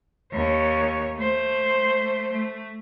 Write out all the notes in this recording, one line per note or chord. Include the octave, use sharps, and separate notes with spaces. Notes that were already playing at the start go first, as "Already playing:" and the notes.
D#2 C#5
A3 C5
A3